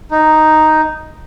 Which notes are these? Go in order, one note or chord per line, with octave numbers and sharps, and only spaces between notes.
D#4